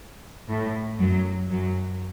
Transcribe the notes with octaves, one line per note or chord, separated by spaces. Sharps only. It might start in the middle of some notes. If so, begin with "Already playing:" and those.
A2
F#2 F#3
F#2 F#3